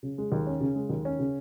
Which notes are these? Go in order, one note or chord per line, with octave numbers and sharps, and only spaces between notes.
C#3
G#3
D#2
C#4
C#3
G#3
D#2
C#4
C#3